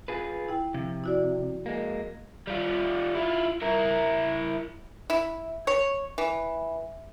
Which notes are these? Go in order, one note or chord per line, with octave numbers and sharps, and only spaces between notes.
F4 G#4 B4
E4 G5
C3 F3
E4 F#4 D5
G#3 A#3
G3 F4
E4 F4
E4 A#4
E4
C#5
E3